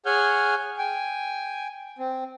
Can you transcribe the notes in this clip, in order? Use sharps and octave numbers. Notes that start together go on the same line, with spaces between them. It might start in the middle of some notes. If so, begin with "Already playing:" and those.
G#4 C#5 F#5 G#5 F6 G6
G5 G#5
C4